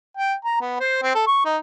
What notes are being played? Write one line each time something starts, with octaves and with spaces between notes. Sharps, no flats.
G5
A#5
B3
C5
C4
A4
C#6
D#4